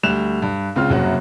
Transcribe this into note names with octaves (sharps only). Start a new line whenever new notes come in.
D2 G3 F#6 E7 F7
G2
C#2 C#3 C4 F4 F6
F#1 C2 F#2 F#3 F#4